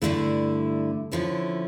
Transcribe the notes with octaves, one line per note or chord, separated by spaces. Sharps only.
G2 D3 A3 E4
D3 F3 C#4 E4